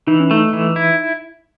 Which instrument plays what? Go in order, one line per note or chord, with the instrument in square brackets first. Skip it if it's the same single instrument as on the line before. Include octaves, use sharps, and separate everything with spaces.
[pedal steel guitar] E3 [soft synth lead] D#4
[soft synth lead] C#4
[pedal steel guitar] A3 [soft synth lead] D#4
[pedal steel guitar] E3
E4